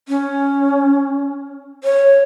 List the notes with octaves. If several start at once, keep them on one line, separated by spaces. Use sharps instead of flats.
C#4
C#5